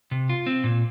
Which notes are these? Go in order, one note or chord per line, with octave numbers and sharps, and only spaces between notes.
C3
F4
C4
A#2